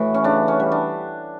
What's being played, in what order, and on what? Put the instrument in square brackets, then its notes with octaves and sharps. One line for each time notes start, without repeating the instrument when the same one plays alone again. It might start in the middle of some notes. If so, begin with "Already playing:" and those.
Already playing: [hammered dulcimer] A2 E3 F#4
C#4
C#3 D4
C#4
G3
D4